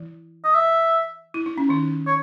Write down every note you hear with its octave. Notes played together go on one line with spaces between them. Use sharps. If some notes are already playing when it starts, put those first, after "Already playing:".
Already playing: E3 E4
D#5
E5
E4
D#4
C#4
D#3 D#4
C#5